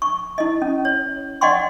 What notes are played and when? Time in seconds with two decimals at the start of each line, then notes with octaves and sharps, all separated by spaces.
0.02 C#6
0.38 E4 D#5
0.62 C#4
0.85 C#5
1.41 D5 D#5 F#5 G5 C6 C#6